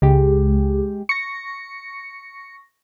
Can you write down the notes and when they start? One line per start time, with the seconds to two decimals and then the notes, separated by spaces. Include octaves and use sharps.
0.02 C#2 G#3 G4
1.09 C#6 A#6 C#7